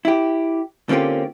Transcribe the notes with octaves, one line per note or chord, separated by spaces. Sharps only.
E4 G4
D3 A#3 C4 C#4 F4 G4